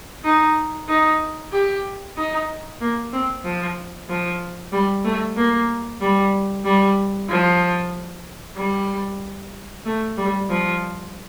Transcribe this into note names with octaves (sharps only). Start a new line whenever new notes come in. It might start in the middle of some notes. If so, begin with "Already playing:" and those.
D#4
D#4
G4
D#4
A#3
C4
F3
F3
G3
A3
A#3
G3
G3
F3
G3
A3
G3
F3